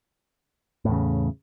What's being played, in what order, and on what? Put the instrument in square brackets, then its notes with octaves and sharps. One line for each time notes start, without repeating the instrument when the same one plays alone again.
[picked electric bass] A2
E2
C#3